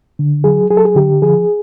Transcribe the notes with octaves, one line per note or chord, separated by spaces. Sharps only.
D3
F#3 G#4
F#3 G#4
A4
G#4
D3 G4
F3 G#4